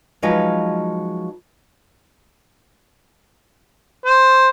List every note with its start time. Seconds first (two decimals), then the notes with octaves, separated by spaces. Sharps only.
0.22 F3 F#3 G#3 D#4 B4 F5
4.05 C5